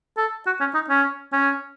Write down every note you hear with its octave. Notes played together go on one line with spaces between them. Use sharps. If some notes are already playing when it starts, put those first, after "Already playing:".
A4
F#4
C#4
D#4
C#4
C#4